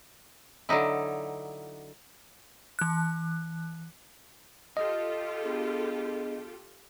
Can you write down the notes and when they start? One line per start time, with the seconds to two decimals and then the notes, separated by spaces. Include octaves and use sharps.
0.69 D3 F#3 D#4 E4
2.79 E3 F#6
4.77 F4 G4 A4 D#5
5.42 B3 D4 G#4